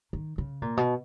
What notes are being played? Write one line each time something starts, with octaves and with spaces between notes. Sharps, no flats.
D#3
C#3
A#2
B2